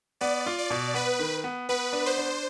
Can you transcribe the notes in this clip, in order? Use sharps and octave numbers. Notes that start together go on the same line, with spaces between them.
B3 D5
F4
D5
B2
B3 B4
D#3
B3
B3 B4
D4
C5
D4